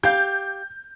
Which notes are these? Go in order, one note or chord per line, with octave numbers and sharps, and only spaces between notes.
G4 F5 G6